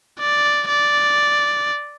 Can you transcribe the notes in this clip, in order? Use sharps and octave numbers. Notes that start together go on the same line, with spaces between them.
D5
D5